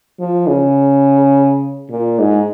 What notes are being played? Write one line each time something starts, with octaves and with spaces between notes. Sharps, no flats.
F3
C#3
A#2
G#2